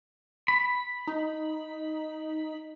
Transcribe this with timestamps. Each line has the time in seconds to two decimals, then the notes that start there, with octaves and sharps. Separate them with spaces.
0.48 B5
1.07 D#4